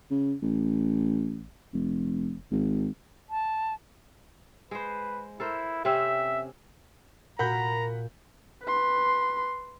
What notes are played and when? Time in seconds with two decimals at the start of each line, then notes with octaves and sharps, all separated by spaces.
0.11 C#3
0.42 A1
1.73 F1
2.51 G#1
3.30 A5
4.71 G#3 B4 C5
5.40 E4 A4 A#4 C5
5.85 C3 C4 C#4 E5
7.39 A#2 F#4 A#4 F#5 A#5 B5 G6
8.63 B4 C6